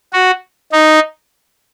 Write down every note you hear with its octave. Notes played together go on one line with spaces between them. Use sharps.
F#4
D#4